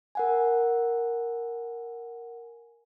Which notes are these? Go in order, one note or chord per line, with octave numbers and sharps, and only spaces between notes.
A#4 F#5 G#5